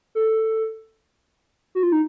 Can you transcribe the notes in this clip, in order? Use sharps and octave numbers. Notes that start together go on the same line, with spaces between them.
A4
F#4
F4
D#4